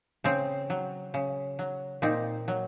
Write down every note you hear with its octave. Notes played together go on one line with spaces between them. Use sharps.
C#3 C4
F#3
C#3
F#3
A#2 C4 D#4
F#3